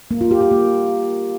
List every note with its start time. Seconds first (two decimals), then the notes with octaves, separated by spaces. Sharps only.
0.11 A#3
0.21 F4
0.31 G4
0.41 G4
0.51 A#3